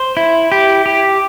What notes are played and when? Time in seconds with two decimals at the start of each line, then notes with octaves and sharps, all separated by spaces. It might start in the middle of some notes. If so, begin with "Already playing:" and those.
Already playing: C5
0.17 E4
0.52 G4
0.86 G4